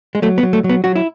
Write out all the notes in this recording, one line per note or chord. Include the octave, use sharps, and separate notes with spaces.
G#3
F#3 A3
B3
F#3
A3
F#3
B3
F#3 F#4
E4